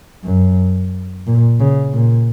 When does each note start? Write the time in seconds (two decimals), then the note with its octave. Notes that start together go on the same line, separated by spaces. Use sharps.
0.25 F#2
1.27 A#2
1.60 C#3
1.94 A#2